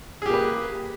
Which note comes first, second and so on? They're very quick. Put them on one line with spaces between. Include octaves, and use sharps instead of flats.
G#4 G4 A#3 B4